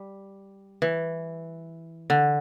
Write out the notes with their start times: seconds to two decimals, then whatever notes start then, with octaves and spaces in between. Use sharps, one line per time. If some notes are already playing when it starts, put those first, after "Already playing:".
Already playing: G3
0.82 E3
2.10 D3